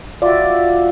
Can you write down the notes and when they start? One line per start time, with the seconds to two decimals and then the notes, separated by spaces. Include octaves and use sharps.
0.22 F4 F#4 D5 E5